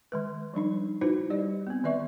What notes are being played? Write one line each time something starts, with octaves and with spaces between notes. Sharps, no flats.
D#3 G#3 B4
F3 G3 D4 D#4
D#4 E4 F#4 B4 C5
G3 G4 D5 D#5
B3 C4
D#3 B4 D5 E5 C#6